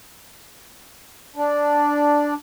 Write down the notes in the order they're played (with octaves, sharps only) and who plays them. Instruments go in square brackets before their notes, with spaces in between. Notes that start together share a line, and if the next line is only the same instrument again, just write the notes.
[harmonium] D4